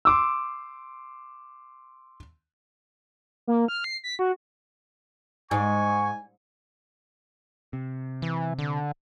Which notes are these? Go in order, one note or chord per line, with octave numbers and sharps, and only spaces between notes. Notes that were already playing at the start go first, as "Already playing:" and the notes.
C6 D6 E6
A#3
F6
C7
B6
F#4
G#2 G#5 C#6
C3
E3
D3